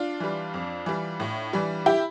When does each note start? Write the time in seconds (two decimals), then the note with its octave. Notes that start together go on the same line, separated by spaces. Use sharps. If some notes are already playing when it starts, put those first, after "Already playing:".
Already playing: D4 F4
0.20 E3 G3
0.54 F2
0.86 E3 G3
1.20 A2
1.53 E3 G3
1.86 E4 G4